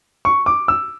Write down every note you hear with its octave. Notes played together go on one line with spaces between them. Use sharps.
C#6
D6
E6